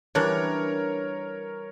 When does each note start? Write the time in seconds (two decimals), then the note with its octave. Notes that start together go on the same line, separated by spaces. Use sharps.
0.15 E3 G3 D4 A#4 C#5